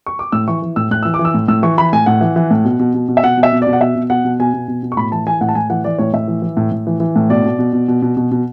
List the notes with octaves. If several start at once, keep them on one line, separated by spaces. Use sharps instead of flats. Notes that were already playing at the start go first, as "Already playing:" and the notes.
C#6
D6
A2 E6
E3 C#6
E3
A2 E6
A2 F#6
E3 E6
D6
E3
E6
A2
A2 E6
E3 C#6
E3 B5
A2 G#5
A2 F#5
E3
E3
A2
B2
B2
B2
B2
E5
B2 F#5
B2
E5
B2
D5
B2
F#5
B2 E5
B2
B2 F#5
B2
B2 G#5
B2
B2
B2
C#6
A2 B5
E3 A5
E3 G#5
A2 F#5
A5
A2 G#5
E3 F#5
E3 D5
A2 C#5
A2 E5
E3
E3
A2
A2
E3
E3
A2
B2 D5
B2
B2
B2
B2
B2
B2
B2